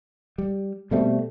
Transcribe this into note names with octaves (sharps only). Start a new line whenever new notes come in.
G3
B2 G3 A3 C4